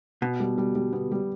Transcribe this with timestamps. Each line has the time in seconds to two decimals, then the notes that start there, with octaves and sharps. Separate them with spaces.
0.22 B2 B3
0.40 G3
0.58 G3
0.75 G3
0.93 B3
1.12 G3